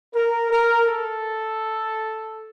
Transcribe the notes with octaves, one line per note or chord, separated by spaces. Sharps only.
A#4
A#4
A4